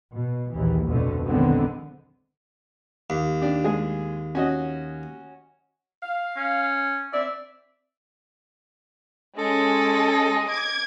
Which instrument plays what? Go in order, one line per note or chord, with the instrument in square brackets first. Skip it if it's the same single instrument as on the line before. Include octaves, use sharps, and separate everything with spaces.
[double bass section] B2
A#1 D#2 E3
F1 D2 B2 D3 A3
B1 D3 D#3 G#3 B3 C4
[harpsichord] D#2
[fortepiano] D4 G4
G#3 G#4
C#4 F#4 D#5
[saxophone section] F5
[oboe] C#4
[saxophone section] C4 D5 [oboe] E5
[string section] G#3 G#4 [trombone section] C#4 [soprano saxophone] A4 [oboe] D#5
[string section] D6 G#6